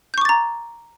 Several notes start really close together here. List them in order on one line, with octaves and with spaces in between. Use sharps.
G6 C#6 D6 A6 A#5